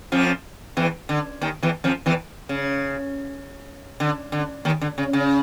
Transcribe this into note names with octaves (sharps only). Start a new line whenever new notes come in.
F2 F3
E2 E3
D3
D#2 D#3
E2 E3
F2 F3
E2 E3
C#3
D3
D3
D#2 D#3
D3
C#3
C#3